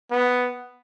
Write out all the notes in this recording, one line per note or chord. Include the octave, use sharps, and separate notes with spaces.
B3